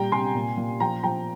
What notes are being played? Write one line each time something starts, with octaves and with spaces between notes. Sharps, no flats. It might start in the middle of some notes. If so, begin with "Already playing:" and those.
Already playing: A#2 G3 G5 A#5
C3 G#5 C6
A#2
A#2
F3 G5 A#5
F3 G5 A#5